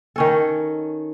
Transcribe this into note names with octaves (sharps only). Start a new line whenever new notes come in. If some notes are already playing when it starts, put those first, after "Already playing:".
D#3 C#4 A4